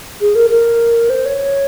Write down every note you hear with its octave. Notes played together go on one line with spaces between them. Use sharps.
G#4
A#4
A#4
C5
C#5